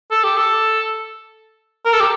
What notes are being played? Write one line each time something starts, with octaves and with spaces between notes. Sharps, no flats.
A4
G4
A4
A#4
A4
G4